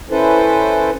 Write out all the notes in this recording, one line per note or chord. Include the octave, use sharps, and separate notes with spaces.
C#4 E4 A4 B4 C5